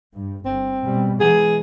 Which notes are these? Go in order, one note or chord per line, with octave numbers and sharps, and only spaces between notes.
G2
G1 C4
B2 G3
E3 G#3 G#4